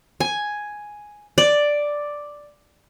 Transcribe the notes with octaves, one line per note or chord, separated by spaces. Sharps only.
G#5
D5